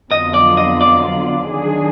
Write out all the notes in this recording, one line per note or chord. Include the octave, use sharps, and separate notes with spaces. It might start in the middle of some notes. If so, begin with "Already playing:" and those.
F2 D3 F#3 B3 F4 D#5
D5
D#5
D5
D#3 F#3 D4 G#4